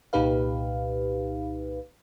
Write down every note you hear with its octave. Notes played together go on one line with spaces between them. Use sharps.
C2 A#2 D#4 G4 B4 F5